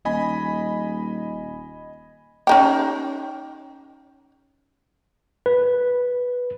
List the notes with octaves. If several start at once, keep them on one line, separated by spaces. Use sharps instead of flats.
D#1 D#5 G#5 B5
C#4 D#4 G4
B4